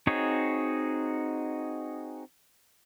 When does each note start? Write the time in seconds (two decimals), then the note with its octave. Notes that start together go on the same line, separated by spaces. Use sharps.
0.07 C4 D#4 F#4 G#4 C#5